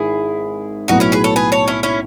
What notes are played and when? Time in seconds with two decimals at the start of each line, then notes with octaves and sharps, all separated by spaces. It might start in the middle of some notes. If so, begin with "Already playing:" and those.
Already playing: G#1 G#2 D#3 E4 G#4
0.88 B1 A2 F#3 B3 D#4 F#4
1.00 C#4 E4
1.12 G#4 B4
1.24 A4 C#5
1.36 G#4 B4
1.52 A4 C#5
1.68 C#4 E4
1.83 C#4 E4